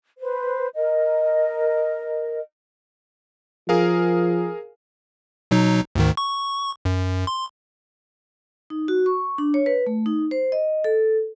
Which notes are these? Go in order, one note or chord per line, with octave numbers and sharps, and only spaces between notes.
B4 C5
A#4 D#5
F3 G#4 A#4 F5
B2 F#3 D#4
D2 G#2 D#3
C#6
F#2
C6
D#4
F#4
C#6
D4
C#5
B4
A3
D#4
C5
D#5
A4